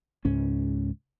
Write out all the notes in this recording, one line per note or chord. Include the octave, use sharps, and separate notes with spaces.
C#2 G#2 C#4